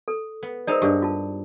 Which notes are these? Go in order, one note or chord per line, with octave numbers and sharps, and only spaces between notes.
A4
B3
G#3 D#4 A#4 C5 D5 A5
G2 G4 A#4 D5
F4 A5